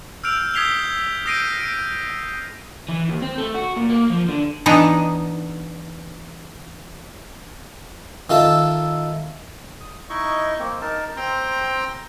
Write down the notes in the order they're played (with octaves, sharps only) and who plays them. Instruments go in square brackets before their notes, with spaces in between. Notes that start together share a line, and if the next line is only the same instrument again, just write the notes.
[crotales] E6 F6 G6 D7 F7
D#6 G#6 B6 C7 F7 G7
D#6 G6 A#6 C7 D7 D#7
D7
[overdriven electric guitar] E3
D#2
C4
A3
F#4
A#2
A#3
F3
D3
[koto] E3 B3 D4 D#4
[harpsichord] D#3 F4 A4 E5
[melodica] D#6
D#4 E4 D#5 C#6
A#3 C4
D#4 A#4 A5
C4 G5 A#5 C6